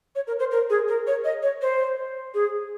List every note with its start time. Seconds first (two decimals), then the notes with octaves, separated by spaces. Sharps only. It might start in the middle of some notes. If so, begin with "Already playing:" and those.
0.15 C#5
0.27 A#4
0.39 C5
0.51 A#4
0.70 G#4
0.88 A#4
1.07 C#5
1.24 D#5
1.43 C#5
1.62 C5
2.34 G#4